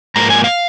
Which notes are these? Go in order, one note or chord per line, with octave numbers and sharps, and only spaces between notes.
G#2 F3 A#3 A#5
G#5
F5